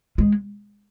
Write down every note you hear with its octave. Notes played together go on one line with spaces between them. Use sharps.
G#3